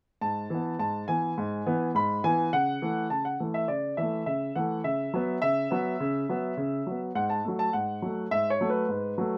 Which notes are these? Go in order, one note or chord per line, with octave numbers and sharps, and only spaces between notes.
G#2 A5
E3 B3
G#2 A5
E3 B3 G#5
G#2
E3 B3
G#2 B5
E3 B3 G#5
C#3 F#5
E3 A3
C#3 A5
F#5
E3 A3
E5
C#3 D5
E3 A3 E5
C#3 E5
E3 A3 F#5
C#3 E5
F#3 B3
C#3 E5
F#3 B3
C#3
F#3 B3
C#3
F#3 B3
G#2 F#5
A5
F#3 A3
A5
G#2 F#5
F#3 A3
G#2 E5
C#5
F#3 A3
B4
G#2
F#3 A3